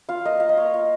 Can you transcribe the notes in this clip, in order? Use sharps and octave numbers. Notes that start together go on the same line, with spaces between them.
F4 F5
A#3 D#5
F4 F5
D#5
A#3 C#5
F4 F5